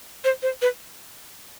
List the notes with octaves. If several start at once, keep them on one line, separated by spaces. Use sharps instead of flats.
C5
C5
B4